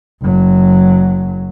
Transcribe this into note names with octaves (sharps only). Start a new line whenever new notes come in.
F#1 F#3